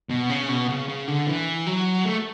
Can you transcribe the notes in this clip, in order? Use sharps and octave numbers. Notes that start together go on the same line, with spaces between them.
B2
C#3
B2
C#3
C#3
D3
E3
F#3
A3